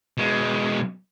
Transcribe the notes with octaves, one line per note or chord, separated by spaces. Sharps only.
B2 G#3